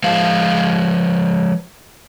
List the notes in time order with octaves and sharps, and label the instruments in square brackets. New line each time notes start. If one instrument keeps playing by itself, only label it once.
[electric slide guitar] F3 G#3 F5